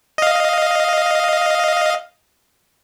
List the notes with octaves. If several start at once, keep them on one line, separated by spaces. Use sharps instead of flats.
D#5 F5